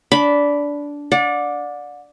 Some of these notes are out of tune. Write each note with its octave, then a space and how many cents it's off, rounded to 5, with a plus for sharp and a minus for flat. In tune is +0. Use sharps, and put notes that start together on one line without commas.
D4 -15 B5 +0
D5 +0 F#5 -40